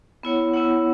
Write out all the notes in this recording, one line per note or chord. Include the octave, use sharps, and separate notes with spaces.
B3 E4 C#5 F#5
B3 E4 C#5 F#5